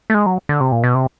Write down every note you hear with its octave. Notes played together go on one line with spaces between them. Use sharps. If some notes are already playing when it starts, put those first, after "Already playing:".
A3
G#3
F#3
D3
C3
A#2
B2
C3